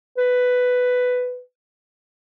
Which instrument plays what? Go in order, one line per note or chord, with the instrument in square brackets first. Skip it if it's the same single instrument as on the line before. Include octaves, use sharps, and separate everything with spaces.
[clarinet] B4